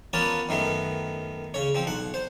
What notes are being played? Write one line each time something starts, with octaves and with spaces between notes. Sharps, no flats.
A#3 B3 C#4 F4 B4 A5
F#2 D#3 A3 B3
C#3 C#5
F3 C4
B1 F#5
C5